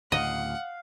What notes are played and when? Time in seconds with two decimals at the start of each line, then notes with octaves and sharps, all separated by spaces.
0.12 D2 A2 C#3 D#5 F5 F#5